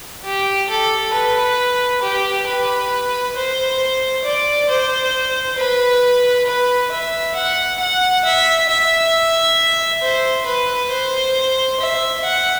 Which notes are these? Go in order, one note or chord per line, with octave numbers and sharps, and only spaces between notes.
G4
A4
B4
G4
B4
C5
D5
C5
B4
B4
E5
F#5
F#5
E5
E5
C5
B4
C5
E5
F#5